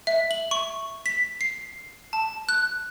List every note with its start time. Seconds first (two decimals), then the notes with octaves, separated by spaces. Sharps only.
0.07 E5
0.31 F#7
0.51 C#6
1.06 B6
1.41 C7
2.13 A5
2.49 F#6